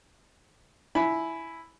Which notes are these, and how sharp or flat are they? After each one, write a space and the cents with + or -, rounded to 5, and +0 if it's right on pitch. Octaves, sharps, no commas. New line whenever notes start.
E4 +0 G#5 +20 B5 +0